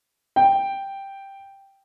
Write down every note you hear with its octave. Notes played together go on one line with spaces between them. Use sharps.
G5